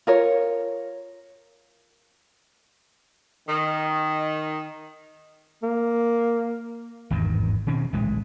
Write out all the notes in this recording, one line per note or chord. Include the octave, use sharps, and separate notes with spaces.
F4 A#4 C#5
D#3
A#3
G#1 E2 G2 D#3
B2 D#3 C4 C#4
D1 A#1 E3 G#3